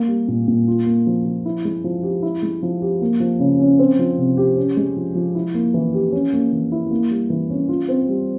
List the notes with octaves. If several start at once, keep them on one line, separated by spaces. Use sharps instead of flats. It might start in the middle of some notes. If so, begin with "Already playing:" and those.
Already playing: A#3
G3
A#2
A#2
F4
A#3
F3
F3
E4
G#3
F3
G4
E4
G#3
F3
G4
A#3
F3
C#3
C#4
C4
F3
C3
G4
C#4
G#3
F3
F3
E4
A#3
E3
G4
C#4
A#3
E3
E4
A#3
G3
E3
C#4
F4
C4
G3